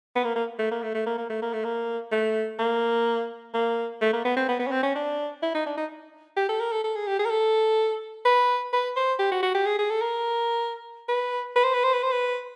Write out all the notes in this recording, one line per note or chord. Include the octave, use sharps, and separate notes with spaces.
B3
A#3
A#3
A3
A#3
A3
A3
A#3
A#3
A3
A#3
A3
A#3
A3
A#3
A#3
A3
A#3
B3
C4
B3
B3
C#4
C4
C#4
D4
E4
D#4
D4
D#4
G4
A4
A#4
A4
A4
G#4
G4
G#4
A#4
A4
B4
B4
C5
G4
F#4
F#4
G4
G#4
G#4
A4
A#4
B4
B4
C5
B4
C5
B4
C5
B4